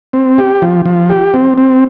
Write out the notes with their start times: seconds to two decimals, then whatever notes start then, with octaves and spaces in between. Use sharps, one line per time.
0.13 C4
0.38 G4
0.62 F3
0.85 F3
1.10 G4
1.34 C4
1.58 C4